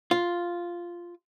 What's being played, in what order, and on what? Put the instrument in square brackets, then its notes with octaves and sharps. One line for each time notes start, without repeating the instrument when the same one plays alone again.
[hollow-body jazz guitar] F4